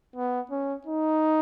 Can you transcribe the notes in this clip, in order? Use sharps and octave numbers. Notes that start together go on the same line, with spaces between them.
B3
C#4
D#4